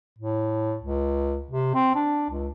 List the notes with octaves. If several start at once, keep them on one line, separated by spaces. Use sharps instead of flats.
A2
C#2
C3
C4
D4
C#2